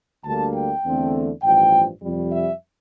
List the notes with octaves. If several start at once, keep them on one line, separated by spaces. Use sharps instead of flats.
D2 D3 G3 A#3 A5
G5
E2 D3 A3 C4
A1 G2 F3 G5
F2 C3 G3
E5